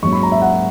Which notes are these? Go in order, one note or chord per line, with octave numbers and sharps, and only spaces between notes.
G#2 F#3 A#3 C#4 C#6
B5
A#5
E5
F#5